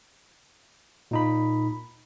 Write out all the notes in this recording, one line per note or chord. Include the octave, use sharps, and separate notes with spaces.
A#2 D#4 B5